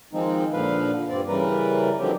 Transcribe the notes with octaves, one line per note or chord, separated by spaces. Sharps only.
D#3 F3 G#3 C4 D#4
A#2 D3 F3 B4 F5
G2 C4 D5
C#3 E3 G3 A#4 B4
D3 D#3 F3 F#3 C4 G4